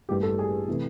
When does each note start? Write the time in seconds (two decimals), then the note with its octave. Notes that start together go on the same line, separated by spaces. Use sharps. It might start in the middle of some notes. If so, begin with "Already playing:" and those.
0.09 A1 G2 E3 G3 A#3 G4
0.23 A4
0.39 G#4
0.68 C3 E3 A3